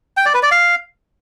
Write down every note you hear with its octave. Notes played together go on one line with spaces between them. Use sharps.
G5
D5
B4
D5
F5